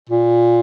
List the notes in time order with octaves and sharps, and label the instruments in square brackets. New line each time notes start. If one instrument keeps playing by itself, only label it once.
[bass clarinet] A#2